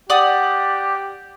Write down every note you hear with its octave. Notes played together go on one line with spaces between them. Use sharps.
G4 D5 F#5 D#6